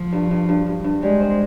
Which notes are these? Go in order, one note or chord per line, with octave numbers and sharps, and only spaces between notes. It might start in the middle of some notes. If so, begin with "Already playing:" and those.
Already playing: F3
G2
G2
G2
G2
G2
G3 G#3
C4